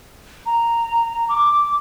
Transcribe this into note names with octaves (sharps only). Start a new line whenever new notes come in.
A#5
D6